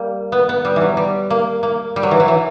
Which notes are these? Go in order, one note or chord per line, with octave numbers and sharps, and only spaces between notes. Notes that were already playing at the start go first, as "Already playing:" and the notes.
Already playing: G3 A#3
B3
B3
G3
E3
F#3
G3
A#3
A#3
G3
F#3
E3
F#3
E3